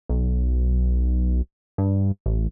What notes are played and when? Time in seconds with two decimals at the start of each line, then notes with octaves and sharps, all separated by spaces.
0.09 B1
1.78 G2
2.26 A1